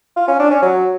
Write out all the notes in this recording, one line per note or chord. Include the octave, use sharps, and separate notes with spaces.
F4
C#4
D4
C#4
F#3